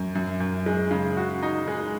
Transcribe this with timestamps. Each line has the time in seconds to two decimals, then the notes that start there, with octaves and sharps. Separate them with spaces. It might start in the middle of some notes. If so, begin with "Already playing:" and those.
Already playing: F#2
0.15 F#2
0.40 F#2
0.66 G#3
0.91 C#3
1.17 F#4
1.43 D#4
1.68 G#3